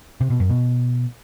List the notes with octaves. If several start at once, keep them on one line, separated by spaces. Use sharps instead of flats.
C3
B2
F#2
B2